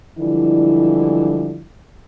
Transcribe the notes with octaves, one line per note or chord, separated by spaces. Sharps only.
D3 E3 F3 G3 G#3 E4